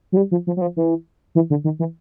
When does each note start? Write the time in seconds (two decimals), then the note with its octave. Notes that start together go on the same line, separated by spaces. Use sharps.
0.12 F#3
0.17 G3
0.31 F3
0.47 F3
0.57 F#3
0.62 F3
0.77 E3
1.35 E3
1.50 D3
1.64 D#3
1.79 E3